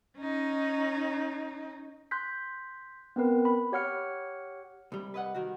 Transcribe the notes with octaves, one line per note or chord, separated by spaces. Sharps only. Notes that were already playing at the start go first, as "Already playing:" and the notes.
C#4 D#4
C6 F#6 G6 B6
B3 C4 A#4 B4
B5
G4 C#5 F#5 F6 C#7
C2 G3
B4 D#5 F#5
D#3 F#4